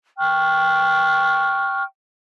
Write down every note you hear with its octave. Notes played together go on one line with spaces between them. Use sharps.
G5 C#6 F6 F#6